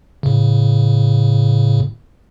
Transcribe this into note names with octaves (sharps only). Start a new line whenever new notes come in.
A2 C#3